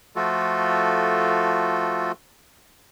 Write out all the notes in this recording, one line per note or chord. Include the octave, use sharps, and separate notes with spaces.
F3 A3 F4 F#4 A4